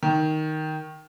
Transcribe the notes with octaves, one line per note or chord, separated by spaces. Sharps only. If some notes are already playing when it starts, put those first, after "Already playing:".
D#3